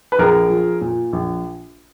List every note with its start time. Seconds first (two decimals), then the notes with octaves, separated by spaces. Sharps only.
0.12 B4
0.19 A#1 G#4 A#4
0.50 F3
0.81 A#2
1.13 A#1